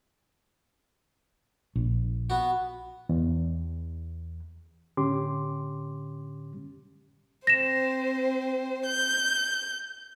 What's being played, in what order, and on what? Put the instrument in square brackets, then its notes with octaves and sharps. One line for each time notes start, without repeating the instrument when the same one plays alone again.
[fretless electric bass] A#1
[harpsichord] B3 F#4
[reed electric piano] E2
A2 D3 C#4 G4 C6 D6
[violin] C4 C5 [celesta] A#6 E7
[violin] G6